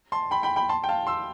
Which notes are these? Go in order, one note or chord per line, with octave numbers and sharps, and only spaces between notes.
A5 C6
G5 B5
G5 B5
G5 B5
A5 C6
G5
F5 A5
C6 E6